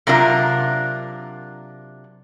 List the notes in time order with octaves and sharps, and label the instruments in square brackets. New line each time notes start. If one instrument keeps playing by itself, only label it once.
[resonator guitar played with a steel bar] C3 F#3 D4 F4 A#4